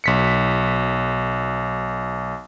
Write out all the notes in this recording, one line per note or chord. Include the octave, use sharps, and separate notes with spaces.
B1 B6 C#7